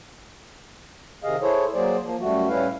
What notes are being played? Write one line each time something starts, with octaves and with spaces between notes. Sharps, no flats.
C3 D#3 G#4 D#5 F5
E4 G#4 A4 C5 C#5
F#3 A#3 G#4 C5 D5
F3 A#3
F#2 G3 A3 F#4
A2 G3 C#4 E4 B4 F5